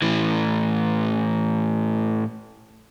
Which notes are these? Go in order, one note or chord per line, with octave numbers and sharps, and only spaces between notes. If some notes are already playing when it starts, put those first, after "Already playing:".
A2 E3